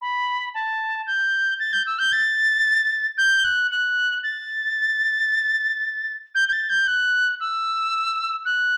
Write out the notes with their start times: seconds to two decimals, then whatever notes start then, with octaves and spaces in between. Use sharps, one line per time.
0.01 B5
0.54 A5
1.07 G6
1.59 A6
1.73 G6
1.86 E6
1.99 G6
2.12 A6
3.17 G6
3.44 F#6
3.71 F#6
4.23 A6
6.34 G6
6.48 G6
6.52 A6
6.69 G6
6.87 F#6
7.40 E6
8.45 F#6